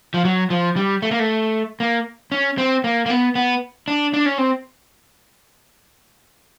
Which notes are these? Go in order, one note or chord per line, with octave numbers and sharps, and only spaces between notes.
F3
F#3
F3
G3
A3
A#3
A3
A#3
C#4
C4
A#3
A#3
B3
B3
D4
D4
C#4
C4